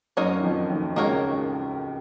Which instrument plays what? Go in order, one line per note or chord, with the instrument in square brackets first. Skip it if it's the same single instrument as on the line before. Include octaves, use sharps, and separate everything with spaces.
[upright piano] F#2 F#3 [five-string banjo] A#3 D#4 F#4 A#4 C#5
[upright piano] D#3
F2 F3
D#2 D#3
[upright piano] C#2 C#3 [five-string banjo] A#3 D#4 F#4 A#4 C#5